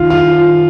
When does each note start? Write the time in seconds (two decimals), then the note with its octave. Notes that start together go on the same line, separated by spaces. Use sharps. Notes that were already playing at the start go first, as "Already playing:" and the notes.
Already playing: D#3 F4
0.10 F4